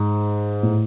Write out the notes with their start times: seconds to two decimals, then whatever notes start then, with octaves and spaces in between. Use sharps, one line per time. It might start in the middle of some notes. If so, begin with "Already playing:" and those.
Already playing: G#2
0.63 A2